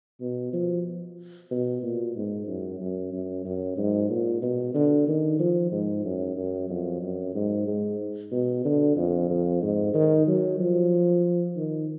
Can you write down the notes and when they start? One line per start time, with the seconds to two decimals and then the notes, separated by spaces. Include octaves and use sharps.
0.21 B2
0.53 F3
1.51 B2
1.83 A#2
2.16 G#2
2.47 F#2
2.80 F#2
3.13 F#2
3.45 F#2
3.77 G#2
4.10 A#2
4.42 B2
4.74 D3
5.07 D#3
5.39 F3
5.72 G#2
6.05 F#2
6.37 F#2
6.70 F2
7.02 F#2
7.34 G#2
7.67 G#2
8.32 B2
8.65 D3
8.97 F2
9.30 F2
9.62 G#2
9.94 D#3
10.27 F#3
10.59 F3
11.57 D#3